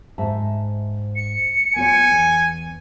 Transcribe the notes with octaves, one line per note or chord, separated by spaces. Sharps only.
G#2 E5 A5
C#7
B3 F4 C#5 G#5
E2